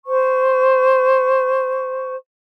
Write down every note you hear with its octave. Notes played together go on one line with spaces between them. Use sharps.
C5 C#6